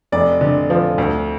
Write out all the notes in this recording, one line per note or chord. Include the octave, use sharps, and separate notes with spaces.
F1 D5
D3
F3
D2